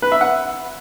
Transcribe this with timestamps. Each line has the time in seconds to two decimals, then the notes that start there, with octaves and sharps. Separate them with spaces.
0.02 B4
0.12 E5
0.21 F#5